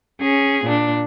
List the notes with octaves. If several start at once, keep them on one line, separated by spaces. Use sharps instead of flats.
C#4 G#4
A#2 D4